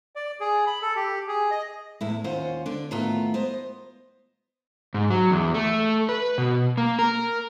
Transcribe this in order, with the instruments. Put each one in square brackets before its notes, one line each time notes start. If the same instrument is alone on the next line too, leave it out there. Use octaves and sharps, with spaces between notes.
[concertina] D5
G#4
B5
A4
G4
G#4
D#5
[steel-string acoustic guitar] E2 A2 E4
D#2 C#4 F4 C5 F#5
D3 D4
D#2 A2 A3 B3 F4 A#4
B3 C5 D#5
[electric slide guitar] G#2
F#3
E2
A3
B4
B2
A#3
A#4